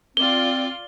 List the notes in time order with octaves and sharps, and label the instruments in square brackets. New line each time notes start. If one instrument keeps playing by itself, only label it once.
[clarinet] C4 [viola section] F4 D5 [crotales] G7